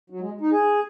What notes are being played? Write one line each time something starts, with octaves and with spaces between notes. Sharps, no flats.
F#3
G#3
D#4
G#4